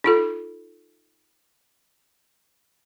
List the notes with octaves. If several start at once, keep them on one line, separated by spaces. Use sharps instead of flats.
D#4 F4 A4